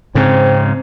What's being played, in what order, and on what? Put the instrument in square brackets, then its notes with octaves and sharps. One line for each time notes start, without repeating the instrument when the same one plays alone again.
[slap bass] G#2 C#3 [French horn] C4